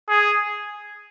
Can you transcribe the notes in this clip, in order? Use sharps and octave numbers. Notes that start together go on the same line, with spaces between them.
G#4